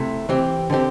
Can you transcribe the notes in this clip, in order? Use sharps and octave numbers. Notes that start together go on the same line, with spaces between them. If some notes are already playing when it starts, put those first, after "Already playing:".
Already playing: C3 A3 E4
E3 C4 G4
D3 C4 G4